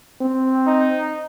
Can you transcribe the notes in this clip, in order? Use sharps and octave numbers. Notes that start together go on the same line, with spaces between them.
C4
D#4